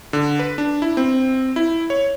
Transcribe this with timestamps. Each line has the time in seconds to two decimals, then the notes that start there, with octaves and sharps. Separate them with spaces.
0.13 D3
0.39 B4
0.58 D4
0.82 E4
0.97 C4
1.56 E4
1.90 C#5